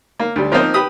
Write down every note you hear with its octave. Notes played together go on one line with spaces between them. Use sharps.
A#3
D2 G3
F3 A#3 C4 D#4 C5
G4 B4 B5 D#6